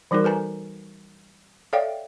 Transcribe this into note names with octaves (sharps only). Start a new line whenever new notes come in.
E3 G3 D#4 F#4 A#4
A4 B4 G#5 A#5
A4 C#5 D5 E5 F5 G5